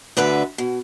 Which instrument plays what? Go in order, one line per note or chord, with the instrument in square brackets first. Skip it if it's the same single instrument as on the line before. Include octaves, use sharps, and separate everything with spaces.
[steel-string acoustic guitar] D2 D3 B4 E5
B2